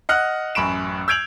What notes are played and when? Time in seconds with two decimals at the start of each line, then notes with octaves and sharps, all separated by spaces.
0.09 D#5 F#5 F6 F#6
0.55 A1 F#2 B5 C#6 D7 E7
1.08 E6 G6 G#6 D7 F7 F#7